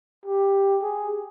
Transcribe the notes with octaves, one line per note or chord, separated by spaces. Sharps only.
G4
G#4